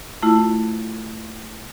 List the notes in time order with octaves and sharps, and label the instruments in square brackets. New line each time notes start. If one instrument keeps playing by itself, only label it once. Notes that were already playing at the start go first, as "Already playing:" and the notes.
[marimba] A3 E4 F4